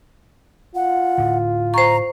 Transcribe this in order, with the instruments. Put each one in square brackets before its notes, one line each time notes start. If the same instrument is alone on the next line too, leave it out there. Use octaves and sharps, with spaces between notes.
[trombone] F4 [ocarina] F#5
[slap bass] A2 D3
[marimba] C5 C#6 [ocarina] A#5